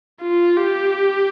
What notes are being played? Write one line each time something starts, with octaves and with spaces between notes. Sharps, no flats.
F4
G4